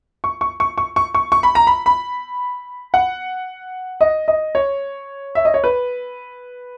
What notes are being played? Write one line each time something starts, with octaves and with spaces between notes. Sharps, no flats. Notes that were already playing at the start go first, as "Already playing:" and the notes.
C#6
C#6
C#6
C#6
C#6
C#6
C#6
B5
A#5
B5
B5
F#5
D#5
D#5
C#5
E5
D#5
C#5
B4